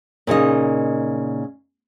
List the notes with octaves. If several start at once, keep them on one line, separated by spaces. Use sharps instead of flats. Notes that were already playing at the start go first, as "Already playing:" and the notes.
A#2 C#3 D#4 D#5